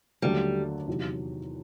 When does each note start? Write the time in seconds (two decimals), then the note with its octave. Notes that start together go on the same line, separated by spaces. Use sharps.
0.22 D#2 D3 F#3 G3 A3
0.87 E2 C3 D#3 F#3